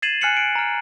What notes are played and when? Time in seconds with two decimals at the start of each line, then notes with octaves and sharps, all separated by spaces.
0.02 G#6 A6 C7 D#7 E7 F#7
0.21 G#5 F6 F#6 C7 C#7 F#7
0.36 C7 D7 F#7
0.55 A#5 F6